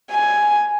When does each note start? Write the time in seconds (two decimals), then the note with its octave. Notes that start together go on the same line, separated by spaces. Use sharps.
0.11 G#5